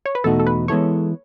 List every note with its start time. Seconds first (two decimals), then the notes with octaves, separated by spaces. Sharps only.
0.06 C#5
0.15 B4
0.24 E2 B2 A3 D#4 F#4 A4
0.40 A4
0.47 B4
0.68 E3 G#3 B3 E4 A4 C#5